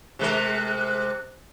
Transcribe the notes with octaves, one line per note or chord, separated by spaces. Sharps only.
C3 G#3 A#4